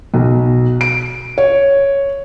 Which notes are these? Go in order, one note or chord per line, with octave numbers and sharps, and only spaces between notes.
B1
D7
C#5